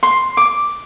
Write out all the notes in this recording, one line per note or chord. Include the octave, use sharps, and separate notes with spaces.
C6
D6